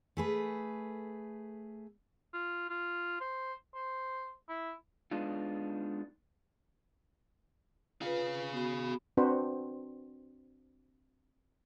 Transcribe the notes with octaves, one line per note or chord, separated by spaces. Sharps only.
A3 G#4 B4
F4
F4
C5
C5
E4
G#3 B3 D4 D#4 F4
F4 G#4 B4 F5
B3 F#4 B5
C4 D4 F#4 B4 C5